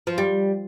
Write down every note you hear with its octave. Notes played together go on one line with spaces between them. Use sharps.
F3
G3